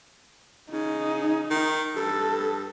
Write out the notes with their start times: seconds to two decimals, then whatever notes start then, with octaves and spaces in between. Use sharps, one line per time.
0.72 C#3 D#4
1.50 D#3
1.96 G2 A4